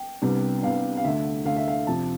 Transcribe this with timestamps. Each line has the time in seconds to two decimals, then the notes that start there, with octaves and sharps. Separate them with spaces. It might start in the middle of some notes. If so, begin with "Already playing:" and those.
Already playing: G5
0.22 C2 C3 G3 B3 D4
0.63 C2 C3 G3 B3 D4 F5
0.97 F5
1.04 D2 D3 A3 D4 E5
1.45 D2 D3 A3 D4 F5
1.56 E5
1.68 F5
1.87 F2 C3 F3 A5